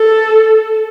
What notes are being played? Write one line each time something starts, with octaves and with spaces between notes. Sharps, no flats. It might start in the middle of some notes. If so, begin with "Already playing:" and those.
Already playing: A4